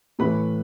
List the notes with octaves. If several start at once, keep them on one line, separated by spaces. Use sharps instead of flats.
A2 E3 A3 B4 B5